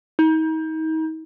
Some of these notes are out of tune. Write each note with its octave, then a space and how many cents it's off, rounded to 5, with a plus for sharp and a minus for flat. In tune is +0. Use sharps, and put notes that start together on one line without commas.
D#4 +35